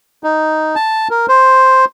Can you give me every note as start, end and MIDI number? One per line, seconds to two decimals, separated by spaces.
0.24 0.75 63
0.76 1.08 81
1.10 1.26 70
1.29 1.85 72